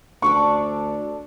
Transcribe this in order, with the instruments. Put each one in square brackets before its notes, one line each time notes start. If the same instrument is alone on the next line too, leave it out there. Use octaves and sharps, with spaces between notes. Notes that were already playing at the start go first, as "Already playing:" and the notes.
[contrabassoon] D2 [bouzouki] D4 A4 D5 [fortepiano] C#6